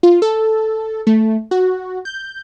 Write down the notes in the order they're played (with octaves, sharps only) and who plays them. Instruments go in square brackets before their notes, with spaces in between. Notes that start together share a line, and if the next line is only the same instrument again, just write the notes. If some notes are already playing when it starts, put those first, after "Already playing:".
[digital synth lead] F4
A4
A3
F#4
G6